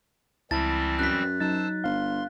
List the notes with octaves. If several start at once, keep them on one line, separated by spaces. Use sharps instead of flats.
C#2 E3 G3 C4 E4 A5 A6
F#2 F#6 B6
F#3 D#4 C5 A5 E6 A6
G1 F5 C6